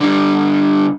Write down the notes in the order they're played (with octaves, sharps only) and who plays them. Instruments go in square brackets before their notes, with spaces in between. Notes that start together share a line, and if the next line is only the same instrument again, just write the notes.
[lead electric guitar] D3 G3